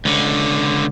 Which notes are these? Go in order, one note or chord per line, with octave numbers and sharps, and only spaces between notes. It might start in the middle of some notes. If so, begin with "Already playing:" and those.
C#2 D3